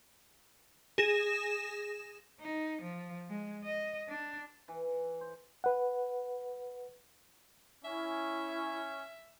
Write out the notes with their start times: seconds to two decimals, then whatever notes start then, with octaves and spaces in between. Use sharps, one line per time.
0.98 G#4 A#6 E7
2.41 D#4
2.82 F3
3.29 G#3
3.64 D#5
4.09 D4
4.68 E3
5.21 C5
5.64 B4 F#5
7.85 C#4 E4 E5